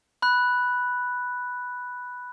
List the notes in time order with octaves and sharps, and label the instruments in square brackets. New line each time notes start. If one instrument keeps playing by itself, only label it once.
[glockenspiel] B5 F#6